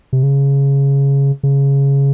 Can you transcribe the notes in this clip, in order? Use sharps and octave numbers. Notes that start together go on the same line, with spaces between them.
C3
C#3
C#3